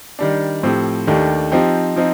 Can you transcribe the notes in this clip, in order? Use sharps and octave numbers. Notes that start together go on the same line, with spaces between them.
D#3 G3 D4
A2 F3 C4 G4
D#2 D#3 A3 D4 G4
F3 C4 D#4 G4
F3 C4 D#4